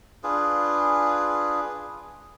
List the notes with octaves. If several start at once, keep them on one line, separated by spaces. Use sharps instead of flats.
D4 F4 G#4 B4